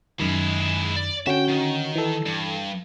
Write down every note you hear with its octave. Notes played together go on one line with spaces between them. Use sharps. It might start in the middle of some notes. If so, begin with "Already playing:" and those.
F#2 D#3 G#3 E4
D5
D3 C#4 F#4 E5 G5
D#3
E3 A4
G2